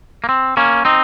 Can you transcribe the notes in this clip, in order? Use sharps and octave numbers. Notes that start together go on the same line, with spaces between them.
A#3
C4
A#3 C#4
C4 D#4